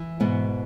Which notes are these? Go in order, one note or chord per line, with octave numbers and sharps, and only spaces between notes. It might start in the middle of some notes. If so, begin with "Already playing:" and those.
Already playing: E3
G#2 B2 B3